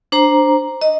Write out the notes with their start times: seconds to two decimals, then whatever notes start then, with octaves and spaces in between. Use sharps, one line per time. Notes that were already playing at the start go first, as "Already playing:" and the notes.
0.12 D4 C5 A#5
0.81 D#5